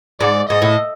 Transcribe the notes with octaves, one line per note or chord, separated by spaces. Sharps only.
G#2 D5
G#2 D#5
A2